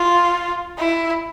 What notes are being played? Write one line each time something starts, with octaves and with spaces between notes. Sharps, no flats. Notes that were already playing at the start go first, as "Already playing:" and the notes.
Already playing: F4
E4